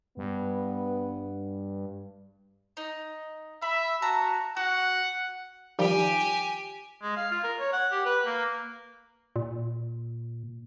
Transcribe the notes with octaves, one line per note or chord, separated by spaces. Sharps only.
G2 B3
D#4
E5 B5
F#4 A5 A#5
F#4 F#5
D#3 F3 G3 G4 G#5
G#3
F5
F4
A#4
C#5
F#5
G4
B4
A#3
A#2